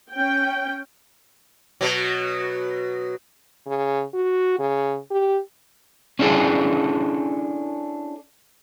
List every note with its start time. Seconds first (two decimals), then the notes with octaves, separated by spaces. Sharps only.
0.13 C#4 G5
1.81 B2 F#3
3.67 C#3
4.14 F#4
4.59 C#3
5.11 G4
6.19 C#4 D4 E4 G#4 A4